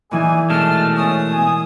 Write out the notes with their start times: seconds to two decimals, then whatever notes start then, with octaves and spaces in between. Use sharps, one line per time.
0.11 A#2 E3 D#4 G#4 G#5
0.50 B2 G#3 A3 A5 F6
0.97 C#4 D#6
1.32 G#5